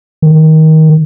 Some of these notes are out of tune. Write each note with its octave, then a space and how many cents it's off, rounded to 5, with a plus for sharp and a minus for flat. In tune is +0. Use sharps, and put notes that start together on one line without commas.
D#3 +20